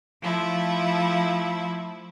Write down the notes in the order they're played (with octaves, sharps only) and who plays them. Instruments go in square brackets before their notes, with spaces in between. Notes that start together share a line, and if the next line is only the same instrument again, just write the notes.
[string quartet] F3 A3 E4